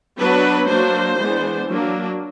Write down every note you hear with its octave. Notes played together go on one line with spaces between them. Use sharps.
F#3 B3 D4 B4
F#3 A#3 D4 C5
E3 G#3 B3 D4
F#3 A#3 D4